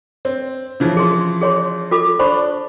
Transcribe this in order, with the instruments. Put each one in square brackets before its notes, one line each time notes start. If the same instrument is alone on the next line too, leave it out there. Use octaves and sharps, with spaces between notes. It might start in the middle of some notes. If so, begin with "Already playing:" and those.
[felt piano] C4
C#3 E3 F3
[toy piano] G#4 C6
G#4 C#5 C6
F4 A4 D6
[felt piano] D4 [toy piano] C5 B5 C#6